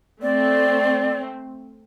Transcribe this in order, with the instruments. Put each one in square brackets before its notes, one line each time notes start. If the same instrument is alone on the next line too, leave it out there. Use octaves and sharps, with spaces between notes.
[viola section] A3 C4 [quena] D5